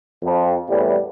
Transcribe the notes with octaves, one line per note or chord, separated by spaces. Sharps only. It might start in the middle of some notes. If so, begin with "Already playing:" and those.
F2
E2 A2 G3